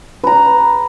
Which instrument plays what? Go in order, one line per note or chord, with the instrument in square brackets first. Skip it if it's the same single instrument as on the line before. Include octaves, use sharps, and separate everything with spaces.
[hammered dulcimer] B4 A#5